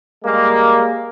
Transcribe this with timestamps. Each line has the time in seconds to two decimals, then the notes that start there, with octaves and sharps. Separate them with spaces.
0.25 G3 G#3 A#3